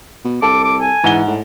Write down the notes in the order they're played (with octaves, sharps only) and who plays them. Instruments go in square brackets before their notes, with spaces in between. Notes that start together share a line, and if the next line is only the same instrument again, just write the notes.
[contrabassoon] B2
[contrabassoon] C2 [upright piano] A4 [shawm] D6
[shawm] D6
G#5
[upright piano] G#2 F#5 G7 [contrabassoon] E3
[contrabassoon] A2